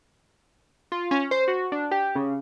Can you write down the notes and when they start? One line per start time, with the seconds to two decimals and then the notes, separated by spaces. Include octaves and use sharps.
0.92 F4
1.11 C#4
1.31 C5
1.48 F#4
1.72 D4
1.91 G4
2.15 C#3